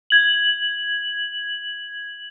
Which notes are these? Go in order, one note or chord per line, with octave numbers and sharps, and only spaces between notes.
G#6 F#7